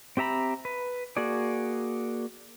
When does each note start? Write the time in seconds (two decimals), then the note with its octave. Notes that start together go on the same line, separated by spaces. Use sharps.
0.17 C4 G4 E5 A#5 B5
0.65 B4
1.17 A#3 F#4 G#4 D5